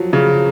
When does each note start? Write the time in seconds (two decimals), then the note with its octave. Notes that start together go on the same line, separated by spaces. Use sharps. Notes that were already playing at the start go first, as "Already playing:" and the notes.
Already playing: F3 F#3
0.13 C#3